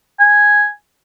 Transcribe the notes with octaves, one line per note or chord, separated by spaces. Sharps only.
G#5